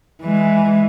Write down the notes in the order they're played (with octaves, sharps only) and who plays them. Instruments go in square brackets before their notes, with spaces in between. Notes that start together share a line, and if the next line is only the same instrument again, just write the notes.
[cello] E3 G#3